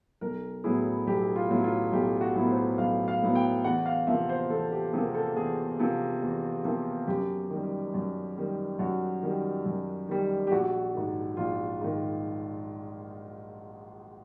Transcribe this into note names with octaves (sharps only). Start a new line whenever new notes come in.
B1 A#4
A2 F#3 B3 E4 G#4
B1 G4
F4
A2 F#3 B3 E4
F4
B1 G4
F#4
A2 F#3 B3 E4
C5
B1 F5
F5
A2 F#3 B3 E4
G5
E2 F#5
F5
C3 F3 A#3 E5
C5
E2 A4
G4
C3 F3 A#3 G#4
A4
E2 G#4
C3 F3 A#3
E2
C3 F3 A#3
F#2 G4
D#3 G3
F#2
D#3 G3
F#2 F#4
D#3 G3
F#2
D#3 G3
G4
A#1 F#4
G#2 D#3
A#1 F4
G#2 D#3